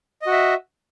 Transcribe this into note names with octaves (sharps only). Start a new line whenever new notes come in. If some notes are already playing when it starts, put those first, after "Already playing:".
F#4 D#5 E5